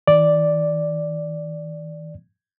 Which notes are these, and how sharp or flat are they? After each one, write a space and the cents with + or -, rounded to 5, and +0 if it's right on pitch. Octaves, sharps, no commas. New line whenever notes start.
D#3 +45 D5 +0